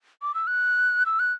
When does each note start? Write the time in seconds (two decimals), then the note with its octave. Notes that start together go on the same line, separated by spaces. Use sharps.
0.22 D6
0.35 E6
0.47 F#6
1.06 E6
1.19 F#6